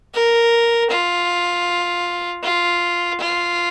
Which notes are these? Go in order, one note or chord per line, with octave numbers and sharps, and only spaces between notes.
A#4
F4
F4
F4